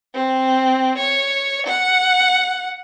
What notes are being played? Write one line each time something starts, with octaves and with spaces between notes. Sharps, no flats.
C4
C#5
F#5